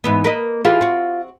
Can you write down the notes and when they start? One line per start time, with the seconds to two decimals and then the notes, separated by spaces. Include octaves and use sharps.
0.04 G#2 E3 B3
0.24 A#3 B4 D#5
0.65 E3 F4 G4 G#4
0.81 C4 F#4